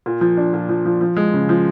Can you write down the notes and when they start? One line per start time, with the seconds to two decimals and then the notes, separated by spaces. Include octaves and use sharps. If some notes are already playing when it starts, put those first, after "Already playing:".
0.06 A#2
0.21 F3
0.37 D4
0.54 A#2
0.69 F3
0.85 F3
1.01 F3
1.17 G#3
1.34 C#3
1.49 F3